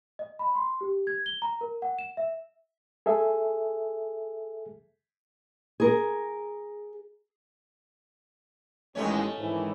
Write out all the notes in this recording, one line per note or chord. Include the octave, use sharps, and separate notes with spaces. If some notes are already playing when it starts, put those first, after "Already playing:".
D#5
B5
C6
G4
G#6
G7
A#5
A#4
F#5
E7
E5
G#4 A4 E5
G#4 A#4
A1 D#2 G#3 A3 C#4 C#5
G#2 D#3 E3